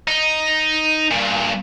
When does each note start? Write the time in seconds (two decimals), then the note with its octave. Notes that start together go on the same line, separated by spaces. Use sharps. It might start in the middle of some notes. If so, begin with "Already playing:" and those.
0.08 D#4
1.11 G2 A#2